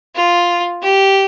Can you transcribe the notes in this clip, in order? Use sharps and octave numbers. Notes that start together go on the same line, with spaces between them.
F4
G4